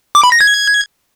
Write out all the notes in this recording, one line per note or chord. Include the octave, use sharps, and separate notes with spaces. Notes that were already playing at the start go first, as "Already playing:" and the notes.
D6
B5
A#6
G#6